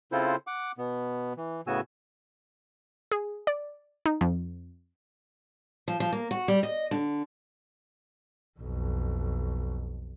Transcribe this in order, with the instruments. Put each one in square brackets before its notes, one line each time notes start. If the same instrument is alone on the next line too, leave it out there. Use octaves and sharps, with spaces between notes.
[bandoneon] C#3 C4 E4 F4 A4 C5
F#5 D6
B2 B3
E3
A2 C#3 B3 F#4 G#5 E6
[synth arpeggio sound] G#4
D5
D#4
F2
[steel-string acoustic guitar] F3
F3
A#3
F#4
G3
D#5
D3
[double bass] B1 F2